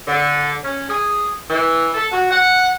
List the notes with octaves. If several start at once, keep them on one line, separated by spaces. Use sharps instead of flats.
D3
C#4
G#4
E3
A4
F#4
F#5